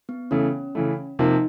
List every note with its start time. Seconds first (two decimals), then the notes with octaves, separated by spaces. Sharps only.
0.09 B3
0.31 C#3 E3 A3 C#4
0.75 C#3 E3 A3
1.19 C3 F3 A#3 D#4